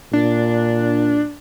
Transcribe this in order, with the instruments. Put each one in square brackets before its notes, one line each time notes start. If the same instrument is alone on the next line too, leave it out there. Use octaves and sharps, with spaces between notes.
[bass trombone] A#2 [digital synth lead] D4